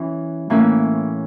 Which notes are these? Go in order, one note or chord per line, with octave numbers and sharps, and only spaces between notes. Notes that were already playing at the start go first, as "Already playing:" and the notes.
Already playing: E3 C#4
A2 E3 A#3 C#4 E4